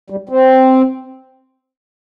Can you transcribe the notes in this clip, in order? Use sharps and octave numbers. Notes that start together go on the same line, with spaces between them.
G3
C4